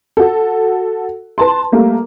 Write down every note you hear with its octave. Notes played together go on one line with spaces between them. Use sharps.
F#4 A4
B4 A5 C6
G3 A3 A#3